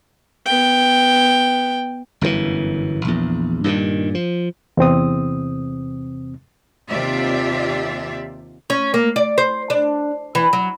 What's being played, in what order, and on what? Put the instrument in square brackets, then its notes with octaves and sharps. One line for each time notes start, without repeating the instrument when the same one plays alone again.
[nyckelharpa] B3 G5
[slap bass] G1 F#2 A2 E3
A#1 E2
G2 A#2 D3 D#3
F3
[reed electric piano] E2 C3 C4 D#6
[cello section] D#2 C3 F4 G4 D5 E5
[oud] C#4
A#3
D5
C5
D4
E3
F#3